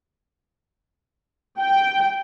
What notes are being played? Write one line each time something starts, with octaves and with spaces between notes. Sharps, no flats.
G5